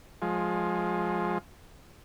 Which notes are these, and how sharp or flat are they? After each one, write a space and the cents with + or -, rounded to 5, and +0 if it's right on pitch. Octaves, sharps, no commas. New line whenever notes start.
F3 +15 G#3 +10